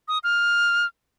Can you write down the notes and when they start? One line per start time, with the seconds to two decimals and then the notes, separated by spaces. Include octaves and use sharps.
0.08 D#6
0.24 F6